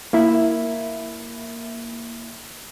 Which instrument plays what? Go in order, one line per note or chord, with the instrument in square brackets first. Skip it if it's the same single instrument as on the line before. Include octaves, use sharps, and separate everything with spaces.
[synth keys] A#3 E4